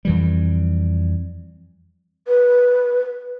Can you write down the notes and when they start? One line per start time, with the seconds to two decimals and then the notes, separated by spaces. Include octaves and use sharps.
0.05 F2 E3 G3
2.28 B4